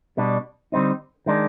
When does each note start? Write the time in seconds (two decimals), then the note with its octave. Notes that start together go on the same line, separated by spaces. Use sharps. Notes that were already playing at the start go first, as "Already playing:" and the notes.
0.17 B2 G3 D4
0.72 D3 G3 C4 D#4
1.26 D#3 G#3 D4